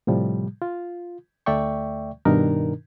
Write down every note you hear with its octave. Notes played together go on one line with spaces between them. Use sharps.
A2 C3 F3 G3
F4
D2 A3 D5 E5 G5 C#6
G2 B2 D#3 D4 D#4 A#4